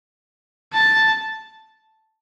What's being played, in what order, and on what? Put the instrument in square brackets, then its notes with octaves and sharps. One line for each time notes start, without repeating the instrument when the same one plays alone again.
[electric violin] A5